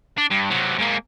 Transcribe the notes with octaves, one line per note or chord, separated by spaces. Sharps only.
D4
G2
C3 F#3
G#2 A#3